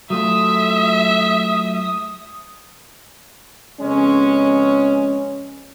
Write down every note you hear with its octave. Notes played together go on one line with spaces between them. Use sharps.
F#3 A3 F4 E5 D#6
F2 C#3 G#3 B3 C#4